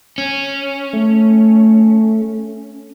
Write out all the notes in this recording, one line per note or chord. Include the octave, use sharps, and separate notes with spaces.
C#4
A3